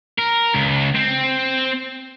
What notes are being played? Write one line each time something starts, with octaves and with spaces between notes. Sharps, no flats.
A#4
C#2
C4